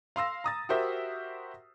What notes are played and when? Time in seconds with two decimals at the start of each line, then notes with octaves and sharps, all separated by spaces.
0.16 F5 C6 E6 A#6
0.44 A#5 D#6 A6
0.69 F#4 G4 A#4 C5 E5